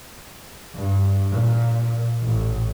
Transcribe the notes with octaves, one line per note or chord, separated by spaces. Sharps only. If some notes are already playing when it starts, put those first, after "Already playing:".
G2
A#2
A1